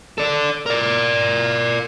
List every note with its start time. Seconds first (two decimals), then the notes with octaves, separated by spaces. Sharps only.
0.18 A4 D5
0.66 A#4 D5